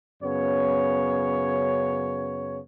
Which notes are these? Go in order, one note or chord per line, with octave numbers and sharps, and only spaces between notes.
F#2 C#3 B3 C#5